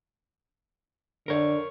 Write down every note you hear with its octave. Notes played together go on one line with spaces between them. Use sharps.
D3 A#4 C#5